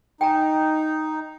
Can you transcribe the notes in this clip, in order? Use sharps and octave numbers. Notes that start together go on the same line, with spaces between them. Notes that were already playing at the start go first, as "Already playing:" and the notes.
D#4 G5 G#5 A#5